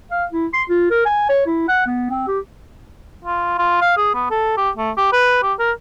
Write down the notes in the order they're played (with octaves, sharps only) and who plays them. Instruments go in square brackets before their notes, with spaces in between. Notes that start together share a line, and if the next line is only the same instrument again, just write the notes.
[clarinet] F5
E4
C6
F4
A#4
G#5
C#5
E4
F#5
B3
C4
G4
[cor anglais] F4
F4
F5
G#4
B3
A4
G4
A3
G4
B4
G4
A#4